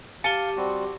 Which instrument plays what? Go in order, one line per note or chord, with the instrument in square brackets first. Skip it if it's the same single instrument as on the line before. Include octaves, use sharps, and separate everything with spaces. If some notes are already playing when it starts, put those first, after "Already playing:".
[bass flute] G4 [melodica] F5 [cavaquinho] A5 [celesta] C#7 D#7 G7
[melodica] G3 C4 F#4